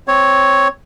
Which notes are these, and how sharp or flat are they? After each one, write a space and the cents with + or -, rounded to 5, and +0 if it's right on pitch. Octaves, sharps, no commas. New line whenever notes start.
C4 +0 C#5 +0